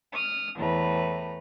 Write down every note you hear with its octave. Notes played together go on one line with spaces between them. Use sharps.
D#6 F6
E2 A2 B4 A#5